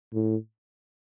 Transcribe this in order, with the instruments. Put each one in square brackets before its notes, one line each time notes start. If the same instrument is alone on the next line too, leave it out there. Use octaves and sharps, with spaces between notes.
[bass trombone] A2